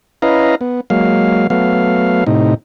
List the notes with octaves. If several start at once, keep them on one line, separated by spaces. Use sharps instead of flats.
C#4 E4 B4 D#5 F5 A#5
B3
F#3 G#3 A#3 F5
F#3 A3 B3 F5
A2 C3 D#4